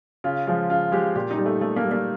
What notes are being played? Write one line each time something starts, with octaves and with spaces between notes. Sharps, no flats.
C#3 F4
F3 G#3 F4
C#3 F4
F3 G#3 G4
A#2 G4
D#4
G3
A3
A#2 A3
A#3
G3
A#3